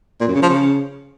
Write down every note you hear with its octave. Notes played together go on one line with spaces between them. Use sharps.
A#2
F#2
C#3
F3
C#3